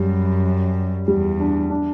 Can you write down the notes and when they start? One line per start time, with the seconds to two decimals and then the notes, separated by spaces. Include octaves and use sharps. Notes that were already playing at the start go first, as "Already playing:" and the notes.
Already playing: F#2 G3
1.08 E2 G3
1.40 D4
1.70 D4